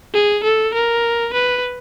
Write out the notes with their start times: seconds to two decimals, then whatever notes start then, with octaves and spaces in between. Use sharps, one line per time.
0.14 G#4
0.44 A4
0.74 A#4
1.34 B4